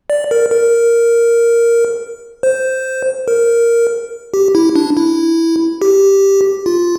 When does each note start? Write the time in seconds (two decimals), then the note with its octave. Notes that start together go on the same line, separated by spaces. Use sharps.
0.10 D5
0.31 A#4
0.51 A#4
2.43 C5
3.28 A#4
4.34 G4
4.55 E4
4.76 D4
4.97 E4
5.82 G4
6.66 F4